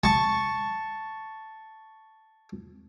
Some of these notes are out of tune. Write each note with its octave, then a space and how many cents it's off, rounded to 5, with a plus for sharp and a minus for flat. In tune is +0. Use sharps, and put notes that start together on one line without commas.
A5 +0 C#6 +0